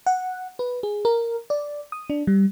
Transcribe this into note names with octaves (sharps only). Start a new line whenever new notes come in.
F#5
B4
G#4
A#4
D5
D#6
D4
G3